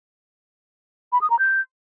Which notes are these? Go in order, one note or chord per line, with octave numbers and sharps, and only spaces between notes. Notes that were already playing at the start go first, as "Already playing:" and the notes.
B5
D#6
A#5
G6